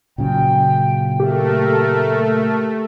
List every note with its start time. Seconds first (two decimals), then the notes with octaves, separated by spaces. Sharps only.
0.18 A#2 C#3 F#3 G5
1.20 A3 G4 A#4